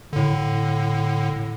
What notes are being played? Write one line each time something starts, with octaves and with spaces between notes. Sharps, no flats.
A2 D3